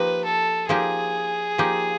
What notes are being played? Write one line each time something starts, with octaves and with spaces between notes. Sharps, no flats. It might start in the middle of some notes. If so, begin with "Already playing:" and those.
Already playing: F3 A#3 D#4 G4 B4
A4
F3 A#3 D#4 G4 G#4
F3 A#3 D#4 G4